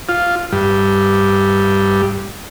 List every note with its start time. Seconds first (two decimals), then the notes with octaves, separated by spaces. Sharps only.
0.09 F4
0.52 G2